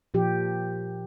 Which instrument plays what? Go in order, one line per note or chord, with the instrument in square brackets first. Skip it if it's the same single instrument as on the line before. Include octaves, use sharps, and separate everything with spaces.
[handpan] A#2 F3 G4